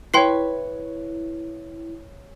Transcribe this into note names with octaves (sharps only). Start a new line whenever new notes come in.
E4 B4 C#5 G5 C6 C7